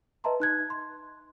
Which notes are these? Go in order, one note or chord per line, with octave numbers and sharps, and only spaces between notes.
B4 D#5 E5 A5 A#5 C6
D#4 F#6 G#6
C6